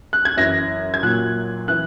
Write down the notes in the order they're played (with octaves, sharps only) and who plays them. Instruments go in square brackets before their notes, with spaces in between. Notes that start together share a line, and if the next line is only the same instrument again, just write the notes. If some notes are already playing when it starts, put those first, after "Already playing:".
[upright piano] F#6
G#6
F#2 E3 A#6
G#6
A#2 F#3 F#6
E3 F#6